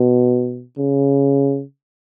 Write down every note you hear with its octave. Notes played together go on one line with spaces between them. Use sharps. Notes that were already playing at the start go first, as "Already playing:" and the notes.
Already playing: B2
C#3